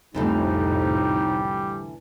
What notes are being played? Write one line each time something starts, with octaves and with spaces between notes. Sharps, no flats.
C2 F2 A2 D3 E3 G3 A3 D#4